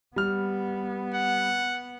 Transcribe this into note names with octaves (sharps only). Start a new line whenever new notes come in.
G3 B3 F6
F#5